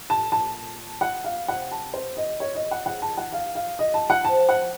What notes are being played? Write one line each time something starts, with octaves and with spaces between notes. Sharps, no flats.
A2 A5
A#2 A5
F#5
F5
C3 F#5
A5
C5
D#5
C#5
D#5
F#5
C#3 F#5
A5
D#3
F#5
F5
F5
D#5
A5
F#5
F3 A5
F#5